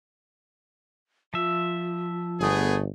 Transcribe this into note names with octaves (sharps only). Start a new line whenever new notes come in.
F3 F4 E5
G1 A3 B3 G#4